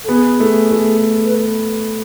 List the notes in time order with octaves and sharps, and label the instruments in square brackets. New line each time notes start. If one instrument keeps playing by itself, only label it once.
[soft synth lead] A4
[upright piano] B3 [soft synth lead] G#4
[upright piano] A3
A3
[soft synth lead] B4